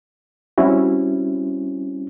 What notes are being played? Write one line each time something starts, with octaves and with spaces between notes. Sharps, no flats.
G3 C4 C#4 E4 F#4